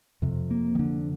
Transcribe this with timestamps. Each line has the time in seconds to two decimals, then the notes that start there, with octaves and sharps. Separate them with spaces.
0.22 F2 C3
0.51 A#3
0.75 D#3
0.79 D3